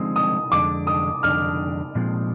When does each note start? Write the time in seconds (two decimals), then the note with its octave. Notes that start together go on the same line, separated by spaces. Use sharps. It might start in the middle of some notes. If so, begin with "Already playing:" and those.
Already playing: D3 F3 G#3 C4 D#4 D#6
0.16 D#6
0.52 F2 D3 G#3 D4 D6
0.87 D#6
1.23 F2 D3 G#3 D4 F6
1.95 A#2 F3 G#3 C4